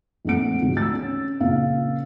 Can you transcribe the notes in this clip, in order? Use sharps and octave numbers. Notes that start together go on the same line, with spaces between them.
A#1 F2 A3 F#5 D7
D2 G#2
E6 A6
C#4
A#2 C#3 F5